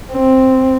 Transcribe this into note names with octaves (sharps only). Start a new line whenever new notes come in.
C4